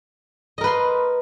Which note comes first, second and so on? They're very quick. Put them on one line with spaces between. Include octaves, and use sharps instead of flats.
D#5 A#4 B4 C6